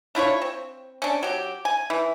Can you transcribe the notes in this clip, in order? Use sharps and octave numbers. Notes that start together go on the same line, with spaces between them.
D4 E4 F4 C#5
C4
C#4 D4
F#3 G4
G#5
E3